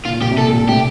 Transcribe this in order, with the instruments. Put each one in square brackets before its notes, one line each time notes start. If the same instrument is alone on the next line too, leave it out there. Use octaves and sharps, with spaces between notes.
[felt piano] A#2 [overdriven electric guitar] F4
[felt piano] A#2 [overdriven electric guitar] G4
[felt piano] C3
[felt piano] A#2 [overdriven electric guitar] A4
[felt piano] A#2
[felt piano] A2 C3 [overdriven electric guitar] G4